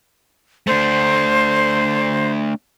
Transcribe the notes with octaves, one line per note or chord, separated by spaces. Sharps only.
A3 D4 C5